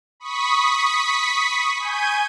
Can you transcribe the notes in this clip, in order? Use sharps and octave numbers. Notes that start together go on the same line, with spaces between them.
B5 C#6 D#6 B6
G#5 G6 G#6 D#7